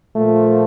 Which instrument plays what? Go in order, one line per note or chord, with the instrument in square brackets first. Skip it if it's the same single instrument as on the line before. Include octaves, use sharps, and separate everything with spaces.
[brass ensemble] A#2 F3 A#3 F4 [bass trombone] A3